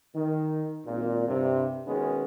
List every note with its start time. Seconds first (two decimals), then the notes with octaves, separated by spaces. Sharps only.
0.15 D#3
0.85 G#1 A#2
1.28 G2 C3
1.87 B2 D#3 G#3 B3 C#4